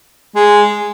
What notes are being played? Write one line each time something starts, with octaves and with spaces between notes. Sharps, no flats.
G#3